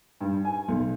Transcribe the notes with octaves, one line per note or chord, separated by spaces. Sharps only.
G2
G#5
B1